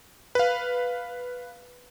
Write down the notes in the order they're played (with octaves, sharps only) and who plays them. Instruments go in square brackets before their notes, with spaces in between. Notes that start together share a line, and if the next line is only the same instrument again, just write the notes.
[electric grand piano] B4 F5